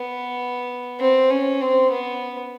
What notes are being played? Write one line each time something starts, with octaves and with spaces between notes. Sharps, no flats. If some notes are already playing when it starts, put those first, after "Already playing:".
Already playing: B3
C4
C#4
C4
B3